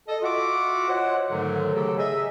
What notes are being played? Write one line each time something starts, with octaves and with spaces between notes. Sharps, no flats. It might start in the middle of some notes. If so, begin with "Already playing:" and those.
A4 D#5
F4 F#4 E5 F#5 D6
C5 C#5 D#5 F#5
G#2 D3 D#3 F#3 A3
C#3 F#3 G4 A4
G#4 D#5 E5